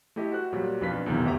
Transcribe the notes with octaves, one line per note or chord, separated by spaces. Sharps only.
A3 E4 G4 D#5
F#4 C5 F#6
A#2 F#3 G3
B1 F2 D4 F4 B4 B6
B1 E2 C3 D#3
G1 D2 G4 E5 F#5 A#5